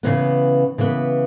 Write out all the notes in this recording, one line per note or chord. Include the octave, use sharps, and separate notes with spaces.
C#3 E3 B3
C#3 E3 B3